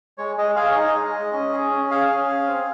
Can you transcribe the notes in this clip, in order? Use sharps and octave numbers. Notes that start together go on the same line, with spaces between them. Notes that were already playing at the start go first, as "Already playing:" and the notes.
G#3 C#5
G#3 D#5
G#4 F5
C#5
D#4 D#5
G#3
G#3
C#4
G#4
C#4
G#4 F5
C#4
G#4
C4